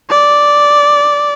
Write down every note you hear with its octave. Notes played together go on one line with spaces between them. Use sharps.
D5